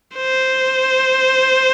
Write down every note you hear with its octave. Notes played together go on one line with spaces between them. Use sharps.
C5